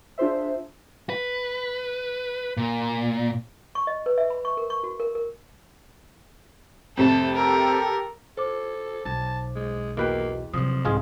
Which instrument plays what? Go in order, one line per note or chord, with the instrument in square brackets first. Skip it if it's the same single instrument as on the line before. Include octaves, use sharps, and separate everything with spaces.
[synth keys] D4 F4 G#4 C5 E5
[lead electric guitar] B4
A#2
[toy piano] C#6
D#5
B4
E5
B5
C#6
A#4
C#6
F#4
A#4
A#4
[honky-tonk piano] F2 C3 A3 [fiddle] A4
[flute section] G4 A4 [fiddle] A#4
[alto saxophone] A4 [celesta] C5 D6
[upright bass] B1 [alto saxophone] A5
[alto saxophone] G#3
[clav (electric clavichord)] E2 B4 G5 [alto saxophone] A#3 [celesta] F#4 D#5
[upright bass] C3 F#3 [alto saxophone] F3 [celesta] D#6
[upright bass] C2 G#2 [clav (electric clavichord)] G#3 F4 G#4